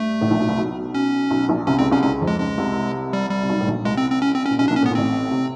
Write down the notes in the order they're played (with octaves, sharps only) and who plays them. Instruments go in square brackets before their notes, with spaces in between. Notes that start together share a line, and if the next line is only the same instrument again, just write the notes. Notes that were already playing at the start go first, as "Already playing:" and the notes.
Already playing: [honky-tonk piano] G2 [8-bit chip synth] A3
[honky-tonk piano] A1 A2
A#1 A#2
B1 B2
C2 C3
B1 B2
[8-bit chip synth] C#4
[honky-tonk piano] B1 B2
A#1 A#2
[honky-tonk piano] C2 C3 [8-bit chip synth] C#4
[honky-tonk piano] C#2 C#3 [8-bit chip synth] C4
[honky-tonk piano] C2 C3 [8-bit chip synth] C#4
[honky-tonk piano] C#2 C#3 [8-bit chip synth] C#4
[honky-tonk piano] F2 F3
[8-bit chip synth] G#3
[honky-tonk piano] C#2 C#3 [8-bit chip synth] G#3
[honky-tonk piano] C2 C3
[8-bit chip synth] G3
G3
[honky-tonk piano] C3
B1 B2
A2
A#1 A#2
[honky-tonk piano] C2 C3 [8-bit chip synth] G#3
[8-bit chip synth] C4
C4
C#4
C4
C#4
[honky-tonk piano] A#2
[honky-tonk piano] B1 B2 [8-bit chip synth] C#4
[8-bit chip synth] D4
[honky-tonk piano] A#1 A#2
[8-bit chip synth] C#4
[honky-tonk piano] A2
[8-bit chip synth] B3
[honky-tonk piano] A#2
[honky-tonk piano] A1 A2 [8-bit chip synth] C4
[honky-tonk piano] C3